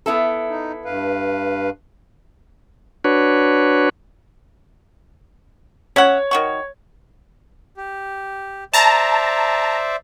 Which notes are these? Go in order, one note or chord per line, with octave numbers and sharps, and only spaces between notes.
B3 E4 A4
D#4
G2 B4 F5
D4 F#4 B4 C#5
C#4 C#5 E5 F#5
D#3 F#4 C#6
G4
C5 D5 E5 A5 A#5